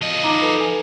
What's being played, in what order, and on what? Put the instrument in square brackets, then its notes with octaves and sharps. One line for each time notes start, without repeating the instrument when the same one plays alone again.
[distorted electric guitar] F3 D#5
[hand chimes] D#4 A#5 D6
A4 B4
G#5